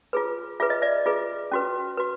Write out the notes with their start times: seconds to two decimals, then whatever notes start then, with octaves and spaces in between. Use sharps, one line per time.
0.13 F4 G#4 B4
0.60 F4 G#4 B4 E5
0.70 D#5
0.82 D5 E5
1.06 F4 G#4 B4
1.52 C#4 F#4 B4
1.97 F#4 B4